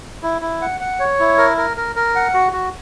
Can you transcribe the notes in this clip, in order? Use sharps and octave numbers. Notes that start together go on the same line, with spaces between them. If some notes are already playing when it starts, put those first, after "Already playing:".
E4
E4
F#5
F#5
C#5
E4
A#4
A#4
A#4
A#4
F#5
F#4
F#4